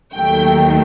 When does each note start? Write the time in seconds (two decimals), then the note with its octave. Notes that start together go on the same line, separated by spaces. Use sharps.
0.14 D#2 D#3 F#3 A3 G5